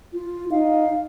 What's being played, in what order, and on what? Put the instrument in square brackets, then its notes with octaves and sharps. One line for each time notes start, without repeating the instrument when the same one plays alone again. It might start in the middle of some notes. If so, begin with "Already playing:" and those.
[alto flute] F4
[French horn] D#4 [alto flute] F5